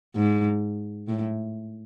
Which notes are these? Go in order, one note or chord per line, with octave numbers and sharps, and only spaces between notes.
G#2
A2